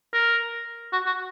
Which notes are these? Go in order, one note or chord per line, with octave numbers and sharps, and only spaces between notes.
A#4
F#4
F#4